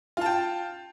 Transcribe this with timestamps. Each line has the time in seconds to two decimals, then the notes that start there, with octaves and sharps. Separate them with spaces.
0.17 F4
0.21 A5
0.26 G5